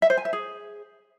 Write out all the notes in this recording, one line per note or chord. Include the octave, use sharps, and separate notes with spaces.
E5
C5
G#5
E5
G#4